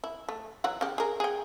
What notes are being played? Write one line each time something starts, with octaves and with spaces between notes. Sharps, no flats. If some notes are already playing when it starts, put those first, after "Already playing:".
E4
A3
E3 F#3 F#5
C#3 G4
G#4 A#4
G#4 G5